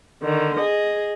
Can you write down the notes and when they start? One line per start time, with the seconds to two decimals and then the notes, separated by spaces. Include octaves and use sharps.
0.23 D3 D#3
0.57 G#4 D#5